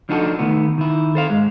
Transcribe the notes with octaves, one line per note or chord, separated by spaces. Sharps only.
F3 D4 D#4 F#4 G#4 A4
D#3 A3 B3
D#3 E4
A4 C5 F5
G#2 G#3